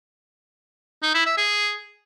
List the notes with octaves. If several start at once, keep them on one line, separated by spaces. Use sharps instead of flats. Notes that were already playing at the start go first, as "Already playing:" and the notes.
D#4
E4
E5
G#4